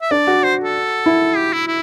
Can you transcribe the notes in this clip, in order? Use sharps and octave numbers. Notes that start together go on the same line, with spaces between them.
E5
D4 D5
F#4
C5
A4
E4
G4
E4
E4